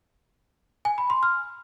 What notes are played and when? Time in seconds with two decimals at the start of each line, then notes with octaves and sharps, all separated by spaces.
0.85 G#5
0.98 B5
1.10 C6
1.23 F6